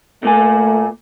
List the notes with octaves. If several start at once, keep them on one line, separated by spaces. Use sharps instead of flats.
A#2 A3 A#3 G#5